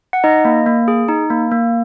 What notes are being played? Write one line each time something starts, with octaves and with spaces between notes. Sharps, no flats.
F#5
D#4 D#5
A#3
A#3
G#4
D#4
A#3
A#3